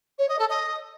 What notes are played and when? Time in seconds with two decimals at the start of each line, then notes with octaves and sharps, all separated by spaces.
0.18 C#5
0.29 D#5
0.39 A4
0.49 D#5